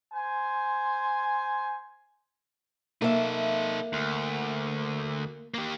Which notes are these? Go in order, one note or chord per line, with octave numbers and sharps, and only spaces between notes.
C5 G#5
A#3 D#4 A4 E5
D2
A#3 G4